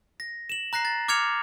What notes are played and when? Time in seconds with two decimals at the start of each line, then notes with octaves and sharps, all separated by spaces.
0.20 A#6
0.49 E7 F#7
0.73 A#5 F#6 A#6 C7
0.85 A6
1.08 D6 F6 G#6 C#7 F7